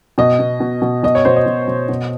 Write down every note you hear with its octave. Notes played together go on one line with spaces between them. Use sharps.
B2 D#5
B2
B2
B2
B2 D#5
C#5
B2 C5
D#5
B2
B2
B2